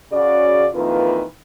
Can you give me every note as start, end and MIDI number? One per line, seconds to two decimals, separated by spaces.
0.12 0.68 49
0.12 0.68 66
0.12 0.68 74
0.74 1.23 41
0.74 1.23 51
0.74 1.23 52
0.74 1.23 58
0.74 1.23 65
0.74 1.23 71